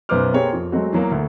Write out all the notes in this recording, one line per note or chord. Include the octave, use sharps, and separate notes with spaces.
B1 F#2 B3 C5 D6 F6
A#3 C4 G4 G#4 C#5
F2
F#3 G#3 A3 C4 F#4
E2 F#3 A#3
D2